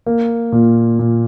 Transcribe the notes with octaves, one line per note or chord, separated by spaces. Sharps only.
A#3
A#2
A#2